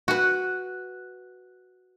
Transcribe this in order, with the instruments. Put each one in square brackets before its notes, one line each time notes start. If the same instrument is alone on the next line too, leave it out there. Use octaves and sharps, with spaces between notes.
[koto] F#4 B4